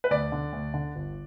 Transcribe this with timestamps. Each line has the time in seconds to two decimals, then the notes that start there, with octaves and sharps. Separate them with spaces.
0.04 B4
0.11 D2 D5
0.32 D3
0.53 D2
0.74 D3
0.95 G1